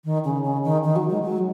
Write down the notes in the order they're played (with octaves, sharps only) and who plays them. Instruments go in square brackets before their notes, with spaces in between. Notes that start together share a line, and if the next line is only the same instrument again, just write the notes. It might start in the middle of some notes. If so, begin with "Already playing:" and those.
[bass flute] D#3
C#3
C#3
D#3
D#3
F#3
G#3
F#3